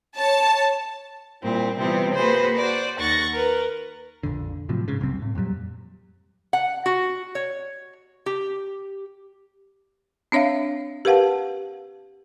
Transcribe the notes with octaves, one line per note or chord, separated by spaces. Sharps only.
C#5 A5
A#2 G3 C4 E4
C3 E3 G3 B3 C4 F4
A#3 F#4 G#4 B4 C5
F#4 C5 D5
D#2 F#5 C#6 A6 A#6
A#4 B4
A#1 F2 D3
A2 C3 F3 F#3
G#2 C#3
F#1 C2 F#2 C4
A2
F2 A#2 F#3 G3
F#5
F#4
C#5
G4
C4 D4 C#5 E5 F5
G4 A#4 B4 F5 F#5 A5